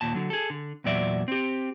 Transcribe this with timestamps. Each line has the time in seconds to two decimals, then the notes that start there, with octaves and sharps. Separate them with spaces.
0.01 D#2 A#2 A5
0.14 D3 F#3
0.30 G#4 A4
0.50 D3
0.84 E2 A#2 F#3 D5 E5
1.28 C4 G4